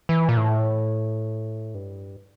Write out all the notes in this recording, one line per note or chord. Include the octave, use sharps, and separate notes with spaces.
E3
A#2
A2
G2